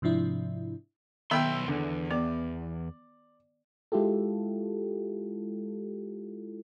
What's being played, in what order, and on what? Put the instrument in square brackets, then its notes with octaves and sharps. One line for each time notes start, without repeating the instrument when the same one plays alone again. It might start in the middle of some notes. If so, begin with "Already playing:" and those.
[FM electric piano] G#2 C3 F3 D4 E4
[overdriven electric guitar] B1 C6 [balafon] D#3 B3 B5 [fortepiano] E5 G5 E6
[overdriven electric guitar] E2 [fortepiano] D3
[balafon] B3 [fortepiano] D5
[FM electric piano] G#3 E4 F4 G4 A4